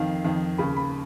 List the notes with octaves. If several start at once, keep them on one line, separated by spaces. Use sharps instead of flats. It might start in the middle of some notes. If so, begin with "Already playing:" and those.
Already playing: F2 D#3 F5
F2 D#3
D#2 C#3 B5
B5